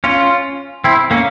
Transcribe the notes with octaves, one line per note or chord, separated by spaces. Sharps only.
C#4 F4
C4 E4
A#3 C#4